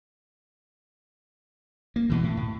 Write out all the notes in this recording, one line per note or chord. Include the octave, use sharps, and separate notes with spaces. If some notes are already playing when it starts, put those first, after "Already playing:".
A#3
G2 B2 E3
A2
A2